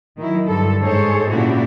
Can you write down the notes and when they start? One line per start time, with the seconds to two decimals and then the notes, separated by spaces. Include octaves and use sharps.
0.18 D#3 F#3 E4
0.48 G2 D3 A4
0.82 G#2 G#4 A4 C5 C#5
1.29 A#2 C#3 D4 E4 F#4 G4